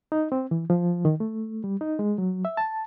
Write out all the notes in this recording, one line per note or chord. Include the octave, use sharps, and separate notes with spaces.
D#4
C4
E3
F3
D#3
A3
G3
D#4
G#3
F#3
E5
A5